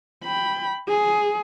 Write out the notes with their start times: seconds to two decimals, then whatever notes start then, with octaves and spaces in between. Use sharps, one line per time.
0.25 G5 B5
0.88 G#4